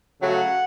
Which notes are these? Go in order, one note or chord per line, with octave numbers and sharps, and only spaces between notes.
C#3 F#3 A3 F#5